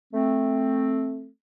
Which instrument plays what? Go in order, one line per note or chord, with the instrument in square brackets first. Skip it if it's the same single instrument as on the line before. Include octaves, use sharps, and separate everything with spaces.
[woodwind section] A3 C4